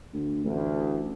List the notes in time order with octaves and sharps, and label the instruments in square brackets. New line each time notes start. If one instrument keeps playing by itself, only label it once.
[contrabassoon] D2
[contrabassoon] A1 [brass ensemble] D2